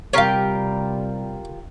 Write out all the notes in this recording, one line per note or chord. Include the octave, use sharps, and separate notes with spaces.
C3 G3 F4 G4 A#4 C#5 F5